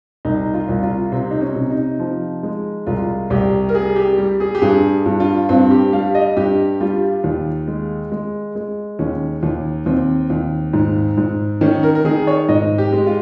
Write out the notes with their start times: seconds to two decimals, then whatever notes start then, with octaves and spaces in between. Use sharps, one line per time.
0.25 C2 D#4
0.54 F4
0.69 C2
0.83 F4
1.12 C3 C4
1.31 D#4
1.41 C#4
1.56 C3
1.70 D#4
1.99 F3
2.43 G#3
2.87 C2 F4
3.30 C2 G4
3.69 A#4
3.75 G3 G#4
3.96 G4
4.18 G3
4.40 G#4
4.55 G4
4.62 G2 G#4
5.06 G2
5.20 F4
5.49 G2 C4
5.71 G4
5.93 G3 F5
6.15 D#5
6.37 G2 G4
6.80 G3 F4
7.24 D#2
7.68 G#3
8.12 G#3
8.55 G#3
8.99 D#2 C#4
9.43 D#2
9.86 D#2 C4
10.30 D#2
10.73 G#2
11.17 G#2
11.61 D#3 C#4
11.83 A#4
11.95 A#4
12.05 D#3 G#4
12.27 C#5
12.49 G#2 D#5
12.78 G4
12.93 G#3
13.07 F4